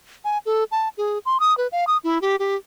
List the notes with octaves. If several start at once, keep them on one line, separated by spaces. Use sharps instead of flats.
G#5
A4
A5
G#4
C6
D#6
B4
F5
D#6
E4
G4
G4